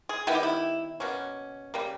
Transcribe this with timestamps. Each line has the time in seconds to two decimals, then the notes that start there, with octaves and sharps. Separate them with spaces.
0.09 G#4
0.27 D#3 G3 B3 E4
0.35 G4
0.43 E4
1.00 B2 A#3 C#4
1.74 C#3 G3 A#3